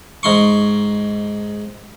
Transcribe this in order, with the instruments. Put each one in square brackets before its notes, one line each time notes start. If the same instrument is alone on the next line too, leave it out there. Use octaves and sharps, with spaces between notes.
[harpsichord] G#2 D#4 C6 C#6